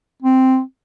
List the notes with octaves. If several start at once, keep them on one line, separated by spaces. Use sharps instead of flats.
C4